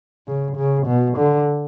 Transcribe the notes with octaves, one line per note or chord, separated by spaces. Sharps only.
C#3
C#3
B2
D3